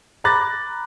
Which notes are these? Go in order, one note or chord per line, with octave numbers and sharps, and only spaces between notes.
A#5 B5 D6 F#6 A6 A#6